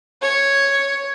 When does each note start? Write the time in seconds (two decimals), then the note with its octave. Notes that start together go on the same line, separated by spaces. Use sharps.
0.22 C#5